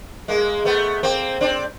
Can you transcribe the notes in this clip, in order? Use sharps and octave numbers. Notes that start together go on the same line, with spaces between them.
G#3 A#3
A3 B3
A#3 C4
C4 D4